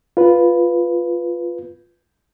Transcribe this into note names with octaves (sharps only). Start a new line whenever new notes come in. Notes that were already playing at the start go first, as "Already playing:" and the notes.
F4 B4